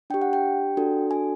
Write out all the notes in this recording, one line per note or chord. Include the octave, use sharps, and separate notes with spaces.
D4 G4 G5
F#5
G5
D4 F#4 A4
G#5